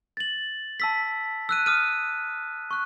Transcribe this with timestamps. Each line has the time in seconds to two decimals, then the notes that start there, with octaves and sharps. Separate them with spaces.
0.17 A6 F#7
0.80 A5 E6 B6
1.49 E6 F#6 D#7
1.66 D#6 F6 D#7
2.71 C#6 F#6